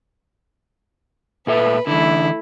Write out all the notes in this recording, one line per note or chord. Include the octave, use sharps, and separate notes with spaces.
A#2 A4 B4 E5
D3 E3 A3 E4